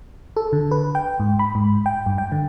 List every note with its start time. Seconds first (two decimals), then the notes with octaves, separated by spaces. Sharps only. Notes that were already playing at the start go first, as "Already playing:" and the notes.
0.37 A4
0.53 D3
0.71 B4
0.95 G5
1.20 G#2
1.39 B5
1.55 G#2
1.86 G5
2.06 G2
2.18 G5
2.32 D3